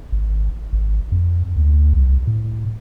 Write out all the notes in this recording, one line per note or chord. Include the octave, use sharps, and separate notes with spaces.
G#1
G#1
F2
D2
C2
A2